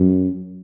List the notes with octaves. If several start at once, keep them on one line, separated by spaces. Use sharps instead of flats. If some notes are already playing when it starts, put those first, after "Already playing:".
Already playing: F#2